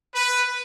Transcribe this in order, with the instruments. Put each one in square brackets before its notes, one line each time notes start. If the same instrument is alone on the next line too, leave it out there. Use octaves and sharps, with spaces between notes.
[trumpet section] B4